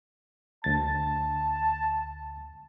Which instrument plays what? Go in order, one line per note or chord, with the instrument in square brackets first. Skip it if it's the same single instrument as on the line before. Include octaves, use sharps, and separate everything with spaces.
[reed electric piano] D2 A6 [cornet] A5